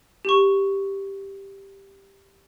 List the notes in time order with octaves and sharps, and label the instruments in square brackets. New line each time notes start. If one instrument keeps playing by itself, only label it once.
[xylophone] G4 C#6